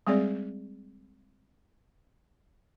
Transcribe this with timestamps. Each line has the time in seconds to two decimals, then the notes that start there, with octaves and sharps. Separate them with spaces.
0.07 G3 G#3 C4 G#4 D5